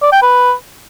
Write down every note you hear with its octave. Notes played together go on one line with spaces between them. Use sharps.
D5
G5
B4